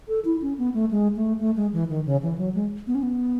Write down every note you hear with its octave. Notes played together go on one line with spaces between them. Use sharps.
A4
E4
C#4
B3
A3
G#3
A3
A3
G#3
E3
D#3
C#3
E3
F#3
G#3
B3
C#4
B3